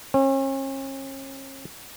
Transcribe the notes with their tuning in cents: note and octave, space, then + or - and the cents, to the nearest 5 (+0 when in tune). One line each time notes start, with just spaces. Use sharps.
C#4 -40